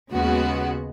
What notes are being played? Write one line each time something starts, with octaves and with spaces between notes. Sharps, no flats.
D#2 C#3 G#3 B3 F#4